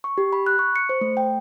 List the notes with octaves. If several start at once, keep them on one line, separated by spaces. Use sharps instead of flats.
C#6
G4
B5
F#6
C#6
C#7
C5
A3
G5